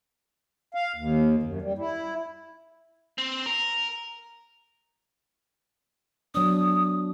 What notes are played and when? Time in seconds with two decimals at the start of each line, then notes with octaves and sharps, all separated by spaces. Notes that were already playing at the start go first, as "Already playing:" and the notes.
0.74 F5
0.96 D#2
1.43 F#2
1.62 G3
1.78 E4
3.18 C4
3.46 A#4
6.35 F#3 B3 D4 D#6